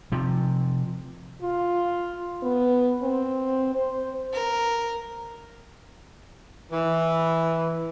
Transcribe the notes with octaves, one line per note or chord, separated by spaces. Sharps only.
C3 F3
F4
B3
C4
C5
A#4
E3